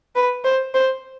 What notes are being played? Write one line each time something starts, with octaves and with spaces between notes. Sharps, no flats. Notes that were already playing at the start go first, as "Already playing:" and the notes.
B4
C5
C5